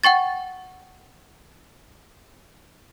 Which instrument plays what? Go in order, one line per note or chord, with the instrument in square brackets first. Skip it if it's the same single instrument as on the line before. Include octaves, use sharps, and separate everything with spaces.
[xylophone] F#5 G5 C#6 A6